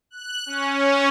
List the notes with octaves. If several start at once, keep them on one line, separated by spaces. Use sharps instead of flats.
F#6
C#4